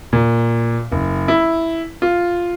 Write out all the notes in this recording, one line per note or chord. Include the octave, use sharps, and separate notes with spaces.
A#2
F#1
E4
F4